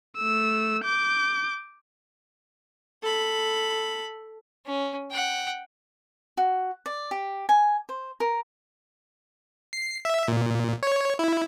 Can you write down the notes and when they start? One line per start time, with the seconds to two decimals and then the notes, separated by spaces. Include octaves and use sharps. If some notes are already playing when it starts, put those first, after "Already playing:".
0.18 A3 E6
0.84 D6 G6
3.02 A4 B5
4.65 C#4
5.11 F#5 G5
6.37 F#4
6.86 D5
7.11 G4
7.49 G#5
7.89 C5
8.20 A#4
9.73 C7
10.05 E5
10.28 A#2
10.83 C#5
11.19 E4